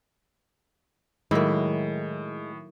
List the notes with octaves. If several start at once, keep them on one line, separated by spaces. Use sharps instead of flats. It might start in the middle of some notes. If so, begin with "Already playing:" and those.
A2 D#3 F#3 G#3 A#3 E4